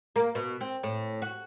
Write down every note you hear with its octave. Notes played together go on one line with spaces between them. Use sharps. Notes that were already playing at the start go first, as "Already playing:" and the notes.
A#3
B2
C4
A2
F#4